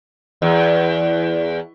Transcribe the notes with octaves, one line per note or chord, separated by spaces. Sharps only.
E2